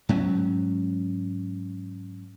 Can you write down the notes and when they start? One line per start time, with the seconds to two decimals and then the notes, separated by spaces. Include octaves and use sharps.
0.09 G#2 F#3 C#4